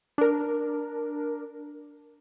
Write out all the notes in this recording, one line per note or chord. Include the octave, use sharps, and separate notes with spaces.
D4 A#4